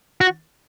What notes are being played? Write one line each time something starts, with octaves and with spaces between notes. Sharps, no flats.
F#4